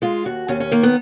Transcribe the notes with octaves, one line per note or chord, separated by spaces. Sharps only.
G#3 F4
D#2 F#4
D#2 C#4
C#4
D#3 A#3
B3